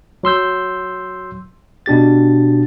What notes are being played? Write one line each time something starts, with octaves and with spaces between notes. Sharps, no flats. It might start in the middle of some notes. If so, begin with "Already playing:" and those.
F#3 C6 E6 G6
B2 D4 G4 A6